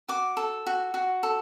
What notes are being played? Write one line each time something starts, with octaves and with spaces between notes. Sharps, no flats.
F#4 D6
A4
F#4
F#4
A4